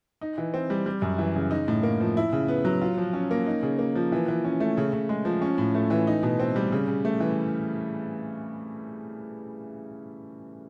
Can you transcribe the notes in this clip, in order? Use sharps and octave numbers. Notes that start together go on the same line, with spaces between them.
D#4
E3
C4
G3
G3
F#2
E3
C#3
D#4
A2
A#3
F3
E4
C#3
B3
F#3
F4
F3
C#4
A#3
D#4
C#3
A#3
F3
E3
E3
C#4
A3
C#3
C#3
G#3
F3
C#4
A2
A3
E3
D#4
B2
C4
G3
C#3
C#3
A3
E3